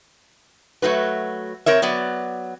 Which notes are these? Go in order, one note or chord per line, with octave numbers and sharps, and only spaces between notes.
F#3 A3 F#4 B4
C4 A#4 C#5 E5
F#3 B3 D5 F#5